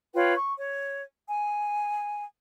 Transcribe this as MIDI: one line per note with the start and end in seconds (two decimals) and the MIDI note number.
0.14 0.33 65
0.14 0.33 71
0.14 0.33 73
0.14 0.33 79
0.36 0.54 85
0.58 1.02 73
1.28 2.24 80